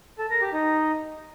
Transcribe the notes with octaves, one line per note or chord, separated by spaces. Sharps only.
A4
A#4
G4
D#4